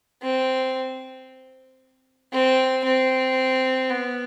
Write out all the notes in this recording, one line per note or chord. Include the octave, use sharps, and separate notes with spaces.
C4
C4
C4
B3